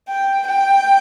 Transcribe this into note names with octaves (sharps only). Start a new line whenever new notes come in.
G5
G5